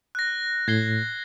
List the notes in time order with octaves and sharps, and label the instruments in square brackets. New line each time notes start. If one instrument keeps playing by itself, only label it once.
[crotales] F#6 A#6
[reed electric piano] A2 [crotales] G#6 C7 G7